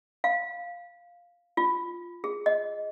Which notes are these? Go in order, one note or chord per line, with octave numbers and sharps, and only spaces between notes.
F5
F4
G#4
D#5